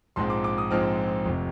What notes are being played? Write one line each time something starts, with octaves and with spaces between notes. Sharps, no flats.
A#1 G#2 F3 G#3 C4 C6
D6
D6
D#6
A#1 G#2 F3 G#3 C4 F6
F1 C3